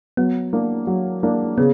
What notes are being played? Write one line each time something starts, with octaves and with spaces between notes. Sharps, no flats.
F#3 B3
A#3 D4
F#3
A#3 D4
C#3 B3